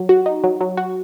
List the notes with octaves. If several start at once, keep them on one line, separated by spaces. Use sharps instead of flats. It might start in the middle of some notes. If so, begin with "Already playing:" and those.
Already playing: F#3
F#4
D#4
F#3
F#3
F#4